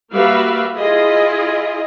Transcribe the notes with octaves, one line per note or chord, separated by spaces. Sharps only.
G3 A#3 F#4 B4 E5 F5
E4 F4 G#4 D#5